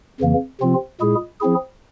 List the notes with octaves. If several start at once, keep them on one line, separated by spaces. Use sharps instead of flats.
F2 C#3 E3 A#3
C3 F3 C4 F4
A#2 G#3 E4 G#4
F3 C4 E4 G#4